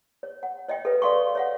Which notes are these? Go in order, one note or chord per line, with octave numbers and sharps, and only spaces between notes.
C#5
F#5
C#5 D#5 E5 G5
A4 B4 E5
A4 D5 F5 C6 C#6
C#5 E5 F#5